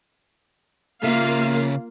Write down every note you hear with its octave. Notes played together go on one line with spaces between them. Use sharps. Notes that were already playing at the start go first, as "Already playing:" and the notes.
C#3 A#3 F4 E5 F5